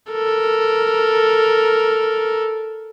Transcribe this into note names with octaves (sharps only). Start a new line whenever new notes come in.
A4 A#4